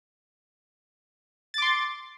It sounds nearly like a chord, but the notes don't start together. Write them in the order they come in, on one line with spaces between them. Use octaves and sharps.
A6 D6 C6